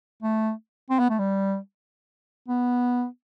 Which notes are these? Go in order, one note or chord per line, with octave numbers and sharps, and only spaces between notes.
A3
C4
B3
A3
G3
B3